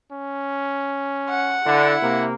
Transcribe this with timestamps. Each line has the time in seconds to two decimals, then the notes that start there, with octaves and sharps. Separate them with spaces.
0.12 C#4
1.30 F#5
1.67 D3 E4
2.02 C3 A#3